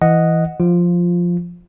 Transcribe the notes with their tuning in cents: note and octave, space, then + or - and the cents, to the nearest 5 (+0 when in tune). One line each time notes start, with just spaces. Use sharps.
E3 +0 D#5 +0 F#5 +0
F3 +5 F4 -5